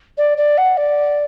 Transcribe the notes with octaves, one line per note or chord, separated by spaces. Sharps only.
D5
D5
F#5
D5